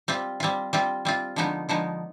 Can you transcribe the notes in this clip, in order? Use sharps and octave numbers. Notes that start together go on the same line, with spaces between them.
G3 C4 F4
G3 C4 F4
G3 C4 F4
G3 C4 F4
D3 F3 G#3 B3 D#4
D3 F3 G#3 B3 D#4